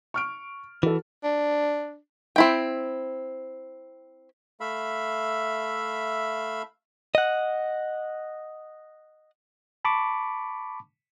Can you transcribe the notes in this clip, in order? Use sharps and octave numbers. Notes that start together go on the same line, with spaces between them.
C#6 F6 D7
E3 F#4 A4
D4
C4 E4 G5
A3 E5 F5 B5
D#5 F#5
A5 B5 C#6 D6